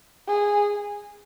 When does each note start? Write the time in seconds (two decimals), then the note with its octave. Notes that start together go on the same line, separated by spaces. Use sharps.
0.28 G#4